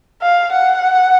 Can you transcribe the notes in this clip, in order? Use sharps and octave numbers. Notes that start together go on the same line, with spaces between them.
F5
F#5